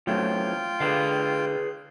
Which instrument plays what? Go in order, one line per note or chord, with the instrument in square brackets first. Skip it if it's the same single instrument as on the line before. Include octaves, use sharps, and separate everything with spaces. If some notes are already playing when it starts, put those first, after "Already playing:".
[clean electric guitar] A2 C#3 [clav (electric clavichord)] F#3 A3 C4 [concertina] F4 G5
[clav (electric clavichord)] D3 [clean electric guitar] G#4 B4 F5